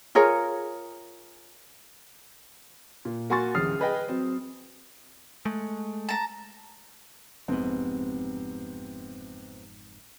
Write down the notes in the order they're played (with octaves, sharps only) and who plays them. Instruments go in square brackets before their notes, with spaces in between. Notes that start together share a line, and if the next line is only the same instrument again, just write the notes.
[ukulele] F4 G#4 A#4 C#5
[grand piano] A#2
A#3 F#4 G#5 C6 C#6 A6
D1 A1 D#6 F6 C7
G#4 B4 D#5 G5
F#3 C4
[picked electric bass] G#3 A3
[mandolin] A5 A#5
[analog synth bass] F#1 [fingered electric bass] F2 G#2 [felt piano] C3 B3 C4